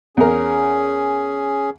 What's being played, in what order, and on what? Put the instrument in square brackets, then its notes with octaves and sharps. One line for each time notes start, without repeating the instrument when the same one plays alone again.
[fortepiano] E2 A#4 [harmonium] C#4 G#4